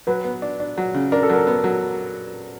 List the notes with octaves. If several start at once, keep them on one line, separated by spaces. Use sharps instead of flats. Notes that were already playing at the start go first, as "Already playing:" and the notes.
F#3 B4
B3
D4
D4
F#3
C#3
D4 A#4
A4
F#3 A#4
B3
F#3